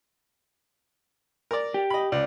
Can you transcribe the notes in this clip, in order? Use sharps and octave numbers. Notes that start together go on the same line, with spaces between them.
A#4 D5
G4
D#5 B5
C#2 D5